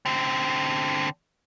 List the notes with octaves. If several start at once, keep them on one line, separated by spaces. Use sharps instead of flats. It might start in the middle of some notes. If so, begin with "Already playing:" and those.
D3 C4